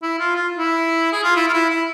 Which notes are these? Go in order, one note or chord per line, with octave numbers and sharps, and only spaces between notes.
E4
F4
F4
E4
G#4
F4
E4
F4
E4
E4